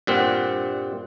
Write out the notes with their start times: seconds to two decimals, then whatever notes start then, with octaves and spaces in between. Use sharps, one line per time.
0.07 G2 A#2 C4 F#5